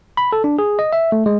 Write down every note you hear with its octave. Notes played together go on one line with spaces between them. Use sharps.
B5
A4
D4
G#4
D#5
E5
A3
G#3